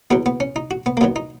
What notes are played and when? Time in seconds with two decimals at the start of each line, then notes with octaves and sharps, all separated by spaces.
0.11 E2 B2 F#3 B3
0.26 B3
0.40 C#4
0.56 D#4
0.71 F#4
0.86 B3
0.97 A#3
1.01 F#2 D#3 F#3 B3
1.16 D#4